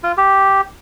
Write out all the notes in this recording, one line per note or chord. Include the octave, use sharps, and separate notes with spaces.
F4
G4